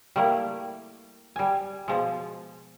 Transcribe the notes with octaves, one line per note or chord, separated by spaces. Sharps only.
G3 A3 A#3 E4
G3 G#5
B2 F3 G#3